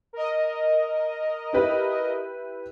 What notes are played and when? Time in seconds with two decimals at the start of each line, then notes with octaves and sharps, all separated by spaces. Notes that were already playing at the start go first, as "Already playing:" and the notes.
0.13 A#4 D#5
1.53 E4 G4 B4